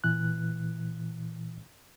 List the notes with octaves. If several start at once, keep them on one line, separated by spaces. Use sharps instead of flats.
A#2 E3 F#6